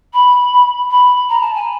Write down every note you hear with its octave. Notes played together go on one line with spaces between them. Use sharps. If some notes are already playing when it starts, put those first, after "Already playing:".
B5
B5
A#5
A5
G#5